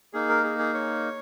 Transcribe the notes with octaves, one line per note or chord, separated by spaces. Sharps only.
A#3 D#4 G#4
A#4
G#4
G#4
C#5